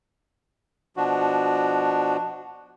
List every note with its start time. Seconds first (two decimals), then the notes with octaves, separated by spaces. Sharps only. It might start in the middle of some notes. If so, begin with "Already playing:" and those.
0.97 B2 F3 D4 F#4